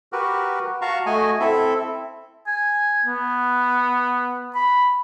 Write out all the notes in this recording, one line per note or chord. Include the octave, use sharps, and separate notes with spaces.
F#4 G4 A#4 B4
F#4 F5 A5 A#5 C#6
A3 F#4 D#5 G#5
C4 E4 A4 E5
G#5
B3
B5